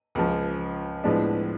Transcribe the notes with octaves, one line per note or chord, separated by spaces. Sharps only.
C#2 C#3 F3
A2 F3 G#3 B3 D4